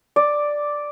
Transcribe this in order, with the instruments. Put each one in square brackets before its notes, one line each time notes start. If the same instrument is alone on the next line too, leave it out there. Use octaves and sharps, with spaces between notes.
[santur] D5